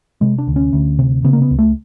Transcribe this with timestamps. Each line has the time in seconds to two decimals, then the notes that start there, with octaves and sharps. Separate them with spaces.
0.21 C3 G#3
0.38 D4
0.48 D2
0.56 C#4
0.73 D2
0.99 C3
1.24 C#3 B3
1.33 A#3
1.42 B3
1.51 C#2
1.59 A3